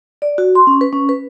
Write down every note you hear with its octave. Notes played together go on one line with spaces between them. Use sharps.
D5
F#4
C6
C#4
B4
C#4
B4